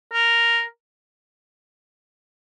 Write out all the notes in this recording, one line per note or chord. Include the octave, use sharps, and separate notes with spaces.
A#4